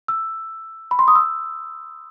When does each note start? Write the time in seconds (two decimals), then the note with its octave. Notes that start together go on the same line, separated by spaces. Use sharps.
0.08 E6
0.91 B5
0.99 C6
1.08 D#6
1.15 E6